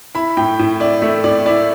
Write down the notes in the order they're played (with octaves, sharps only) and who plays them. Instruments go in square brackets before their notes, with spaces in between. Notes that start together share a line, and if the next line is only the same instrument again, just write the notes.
[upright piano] E4 [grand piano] B5
[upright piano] A2 [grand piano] G5
[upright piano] A2
[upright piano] E4 [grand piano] D5
[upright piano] A3 [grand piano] E5
[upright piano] A2 [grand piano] D5
[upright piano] E4 [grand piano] D5